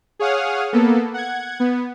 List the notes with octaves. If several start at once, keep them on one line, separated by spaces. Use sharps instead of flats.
G#4 C#5 F5 F#5 D#6 F6
A#3 B3 A4
F#5 G#6
B3